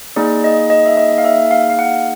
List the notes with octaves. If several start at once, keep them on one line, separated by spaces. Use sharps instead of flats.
A#3 D#4 G#4 D5
D#5
D#5
E5
D#5
F5
E5
F5
F5
F#5